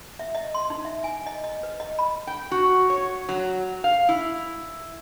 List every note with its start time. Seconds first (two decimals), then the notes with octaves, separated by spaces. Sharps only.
0.19 E5
0.35 D#5
0.54 C6
0.70 D#4
0.85 E5
1.04 G#5
1.26 D#5
1.44 D#5
1.63 B4
1.80 D#5
1.99 B5
2.27 G5
2.51 F#4
2.90 C#5
3.29 F#3
3.84 F5
4.09 E4